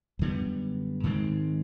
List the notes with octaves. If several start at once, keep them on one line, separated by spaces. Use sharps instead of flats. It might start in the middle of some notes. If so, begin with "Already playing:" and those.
F#2 D3 G3 B3
G#2 D#3 G#3 C4